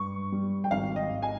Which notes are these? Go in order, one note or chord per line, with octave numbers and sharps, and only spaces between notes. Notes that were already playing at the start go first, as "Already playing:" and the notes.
Already playing: G2 C#6
G3
G5
G#1 F5
D#5
G#1
G#5